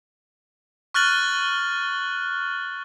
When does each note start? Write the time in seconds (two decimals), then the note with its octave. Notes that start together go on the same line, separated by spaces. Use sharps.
0.94 C#6 F6 F#6 A6 F#7 G7